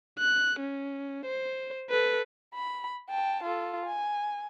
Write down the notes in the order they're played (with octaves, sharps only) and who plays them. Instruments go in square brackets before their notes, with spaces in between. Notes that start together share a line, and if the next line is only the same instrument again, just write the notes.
[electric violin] F#6
C#4
C5
A4 B4
[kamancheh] B5
G5 A5
F4 A4
G#5